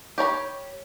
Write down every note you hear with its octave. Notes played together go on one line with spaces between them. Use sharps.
G4 C#5 A#5 B5